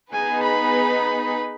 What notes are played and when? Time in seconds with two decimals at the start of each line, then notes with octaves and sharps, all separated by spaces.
0.12 B3 D#4 G#4 B4 G#5
0.44 B5